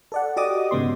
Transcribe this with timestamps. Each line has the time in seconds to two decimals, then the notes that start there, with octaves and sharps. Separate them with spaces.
0.12 A4 D5 F#5
0.36 F#4 G4 D5 D#5 D6 D#6
0.71 G#2 C#3 B3 C6